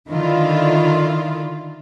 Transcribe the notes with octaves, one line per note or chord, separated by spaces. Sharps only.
D3 D#3 E4 F4